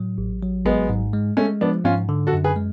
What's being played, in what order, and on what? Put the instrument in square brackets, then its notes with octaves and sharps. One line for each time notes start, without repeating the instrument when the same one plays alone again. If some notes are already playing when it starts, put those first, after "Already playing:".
Already playing: [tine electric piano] A2 F#3
A1
F#3
[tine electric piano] G#1 [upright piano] G#3 B3
[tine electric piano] G#2
G#3
[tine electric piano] G#3 [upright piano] A3 C#4
[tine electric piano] F3 [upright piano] B3 D4
[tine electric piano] G#2 [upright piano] C#4 F4
[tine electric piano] D3
[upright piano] F#4 A4
[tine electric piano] F#2
[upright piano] G#4 B4
[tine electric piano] G#3